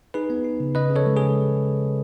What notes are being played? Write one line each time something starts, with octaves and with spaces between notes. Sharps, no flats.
D#4 G#4 B4
B3
D#4
C#3
C#3 B4 D#5
C#3
A4 C#5
G#3
G#4
C#3